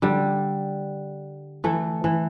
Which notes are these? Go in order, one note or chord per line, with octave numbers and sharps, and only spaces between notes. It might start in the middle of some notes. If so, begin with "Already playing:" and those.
D3 G3
E3 A3
E3